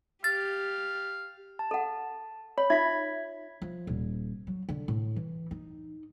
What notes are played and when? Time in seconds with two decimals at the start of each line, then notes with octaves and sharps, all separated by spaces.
0.24 G4 F5 A6
1.59 A5
1.71 A4 F#5
2.58 C#5 B5
2.70 D#4 F4 E5 G#6 B6
3.62 F3
3.87 D#1
4.47 F#3
4.69 D3
4.88 A2
5.16 E3
5.51 D#4